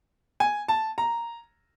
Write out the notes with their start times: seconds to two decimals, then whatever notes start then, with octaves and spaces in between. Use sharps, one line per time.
0.40 G#5
0.68 A5
0.98 A#5